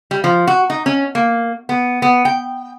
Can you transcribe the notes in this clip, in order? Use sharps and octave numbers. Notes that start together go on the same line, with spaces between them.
G3
F3
F#4
D#4
C#4
A#3
B3
B3
G5